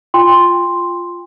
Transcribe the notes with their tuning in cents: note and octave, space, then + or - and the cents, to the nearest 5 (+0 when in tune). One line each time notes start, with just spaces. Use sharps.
F4 +0 G5 +35 C6 +0